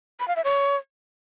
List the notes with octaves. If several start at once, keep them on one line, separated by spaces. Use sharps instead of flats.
B5
F5
E5
C#5